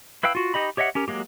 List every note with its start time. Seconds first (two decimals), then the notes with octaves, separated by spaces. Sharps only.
0.23 E4 B4 F5 G5 E6
0.35 F4 F#4
0.54 D#4 G4 D#5 B5
0.77 G4 C#5 D#5 E5 F#5
0.95 C#4 G4 A#4
1.08 F#3 G#3 A#3 G4